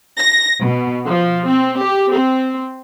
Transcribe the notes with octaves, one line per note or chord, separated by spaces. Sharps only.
A#6
B2
F3
C4
G4
C4